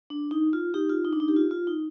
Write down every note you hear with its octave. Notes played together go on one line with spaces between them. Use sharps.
D4
D#4
F4
D#4 G4
F4
D#4
D4
D#4
G4
F4
F4
D#4